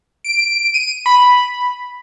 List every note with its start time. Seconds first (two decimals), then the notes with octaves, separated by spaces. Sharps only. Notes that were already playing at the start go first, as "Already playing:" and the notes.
0.24 D7
0.74 D#7
1.06 B5